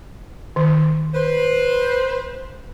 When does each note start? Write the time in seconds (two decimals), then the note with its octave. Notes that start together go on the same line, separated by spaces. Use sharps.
0.56 D#3
1.14 B4 C5